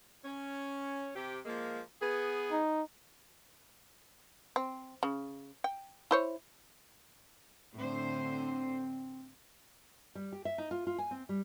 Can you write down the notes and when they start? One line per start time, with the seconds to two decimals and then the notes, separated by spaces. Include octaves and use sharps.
0.24 C#4
1.14 C3 G4
1.45 F3 G#3 A#3
2.01 B3 G#4
2.52 D#4
4.56 C4
5.03 C#3
5.64 G5
6.11 E4 C5 C#5
7.78 A2 D3 C4 C5
10.15 G3
10.32 G4
10.45 E5
10.58 D#4
10.71 F4
10.87 F4
10.98 G#5
11.11 C4
11.29 G3